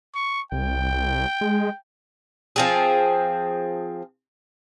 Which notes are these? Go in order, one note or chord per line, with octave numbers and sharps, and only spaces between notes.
C#6
C2 G5
G#3
F3 C4 G#4